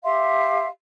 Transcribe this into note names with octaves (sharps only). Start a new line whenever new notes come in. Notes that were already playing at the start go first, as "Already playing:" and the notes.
G4 E5 F5 C6